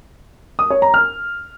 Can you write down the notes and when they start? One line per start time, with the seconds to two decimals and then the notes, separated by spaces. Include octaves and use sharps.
0.59 D#6
0.70 C#5
0.82 A#5
0.94 F6